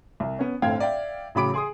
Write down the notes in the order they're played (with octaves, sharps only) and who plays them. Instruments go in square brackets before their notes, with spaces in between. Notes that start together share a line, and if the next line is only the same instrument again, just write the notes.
[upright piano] C2
B3 C#4
G1 A2 C4 F5 G5 G#6
D5 E5 F5 G5
A1 C#3 F#3 B5 D6 D7
G#4 C6 D#6